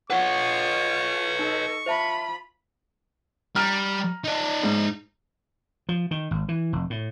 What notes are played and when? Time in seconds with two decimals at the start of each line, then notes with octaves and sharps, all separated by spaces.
0.10 F4 B4 C#5 F#5 C#6
1.39 D#4 A4 D#5
1.86 F4 C5 E5 A5 B5
3.56 G3 A#5 F6
4.24 D#4 D5
4.63 G#2
5.89 F3
6.11 D#3
6.31 G#1
6.49 E3
6.73 F1
6.90 A2